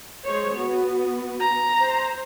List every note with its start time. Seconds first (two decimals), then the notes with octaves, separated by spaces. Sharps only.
0.25 G#3 C5 C#5
0.55 B3 F#4
1.40 A#5
1.82 C5